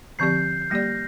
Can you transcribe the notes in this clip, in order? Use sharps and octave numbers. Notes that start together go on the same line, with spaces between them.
D3 F3 C4 G4 D5 G6 C7
G6
G3 A#3 G4 D5 F6 A#6